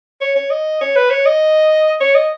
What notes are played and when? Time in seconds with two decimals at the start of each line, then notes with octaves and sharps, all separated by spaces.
0.21 C#5
0.36 C#5
0.50 D#5
0.81 C#5
0.96 B4
1.10 C#5
1.26 D#5
2.01 C#5
2.15 D#5